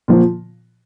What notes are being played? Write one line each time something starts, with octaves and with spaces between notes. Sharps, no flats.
A#2 F3